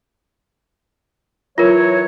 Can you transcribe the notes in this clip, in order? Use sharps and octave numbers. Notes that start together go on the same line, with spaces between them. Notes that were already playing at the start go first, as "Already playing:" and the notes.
E3 F#3 F4 A#4 C#5